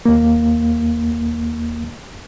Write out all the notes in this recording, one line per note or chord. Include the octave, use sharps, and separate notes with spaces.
D#2 A#3